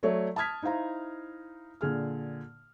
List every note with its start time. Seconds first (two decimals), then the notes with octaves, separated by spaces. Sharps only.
0.03 F#3 A3 C#5 D5
0.36 A5 D#6 F6 G#6 B6
0.63 D#4 E4 C5 F5 A#5
1.81 A#2 D3 G#4 F6